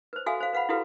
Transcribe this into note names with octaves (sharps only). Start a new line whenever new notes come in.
B4 C5
F#4 A4 E5 F5 G#5
C5 F5
B4 F5 F#5 B5
E4 F#4 G4 A4 B4 F5